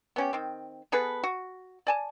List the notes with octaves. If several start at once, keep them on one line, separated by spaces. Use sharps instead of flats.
B3 C#4 G4
D#3 C4
B3 G#4 A4 B4
F#4
D5 G#5 A5